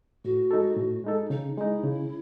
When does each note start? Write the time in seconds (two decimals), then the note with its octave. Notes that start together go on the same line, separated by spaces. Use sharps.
0.25 A2 F#4
0.51 G#3 D#4 A4
0.77 A2
1.04 G#3 D#4 A4
1.30 C#3 D#4
1.57 G#3 D#4 E4
1.83 C#3